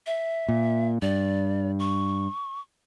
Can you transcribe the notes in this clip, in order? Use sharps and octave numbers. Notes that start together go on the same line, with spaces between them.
E5
A#2
G2 D5
C#6